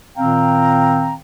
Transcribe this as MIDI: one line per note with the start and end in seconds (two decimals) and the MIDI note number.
0.17 1.14 46
0.17 1.14 51
0.17 1.14 60
0.17 1.14 77
0.17 1.14 79
0.17 1.14 82